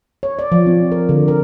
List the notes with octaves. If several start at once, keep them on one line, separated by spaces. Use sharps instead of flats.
C#5
D5
F3
C4
A#4
D3
A#4